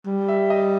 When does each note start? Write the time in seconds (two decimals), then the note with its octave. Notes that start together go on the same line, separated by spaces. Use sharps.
0.06 G3
0.28 E5
0.50 D#5